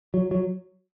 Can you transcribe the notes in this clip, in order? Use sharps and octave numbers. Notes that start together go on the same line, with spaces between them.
F#3
F#3